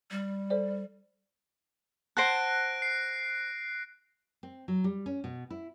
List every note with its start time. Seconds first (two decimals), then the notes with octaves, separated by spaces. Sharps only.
0.11 G3
0.50 A4 C5 D5
2.17 C5 F#5 A5 F#6 A#6 D7
2.82 C7
4.43 C4
4.68 F#3
4.84 G3
5.06 C#4
5.24 B2
5.50 E4